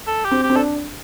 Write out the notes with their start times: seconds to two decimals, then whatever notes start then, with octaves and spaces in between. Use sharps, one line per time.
0.07 A4
0.25 G4
0.31 C4
0.43 G4
0.50 C4
0.56 D4 A4